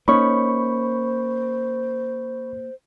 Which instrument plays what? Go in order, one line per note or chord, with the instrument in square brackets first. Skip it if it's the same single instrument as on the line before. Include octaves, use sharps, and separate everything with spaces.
[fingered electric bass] A#3 [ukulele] C#4 D#4 C#5 [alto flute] C5 [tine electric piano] B5 C#6